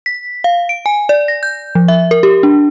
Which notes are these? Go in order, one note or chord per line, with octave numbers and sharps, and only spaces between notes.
B6
F5
D7
G#5
D5
A#6
G6
F3
E5
A#4
G4
D4